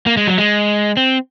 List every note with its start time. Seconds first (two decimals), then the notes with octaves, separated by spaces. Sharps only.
0.07 A#3
0.17 G#3
0.27 F#3
0.38 G#3
0.97 C4